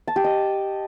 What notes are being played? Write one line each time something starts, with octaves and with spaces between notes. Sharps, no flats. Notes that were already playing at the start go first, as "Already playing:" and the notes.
A5
G4
D#5